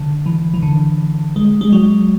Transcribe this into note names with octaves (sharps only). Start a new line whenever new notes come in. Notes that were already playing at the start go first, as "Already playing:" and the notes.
Already playing: D3
E3
E3
D3
G#3
G#3
F#3